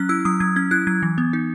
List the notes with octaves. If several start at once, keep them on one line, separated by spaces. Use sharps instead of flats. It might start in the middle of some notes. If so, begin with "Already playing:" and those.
Already playing: F#3 C#4 F#6
E4 E6
F#3 D#6
F#3 G#6
C#4 G#6
E4 F#6
F#3 G#6
E3
B3
D#4